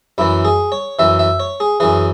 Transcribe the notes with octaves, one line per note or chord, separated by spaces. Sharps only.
F#2 E3 E4
G#4
C#5
F#2 E3 E5
E5
C#5
G#4
F#2 E3 G#4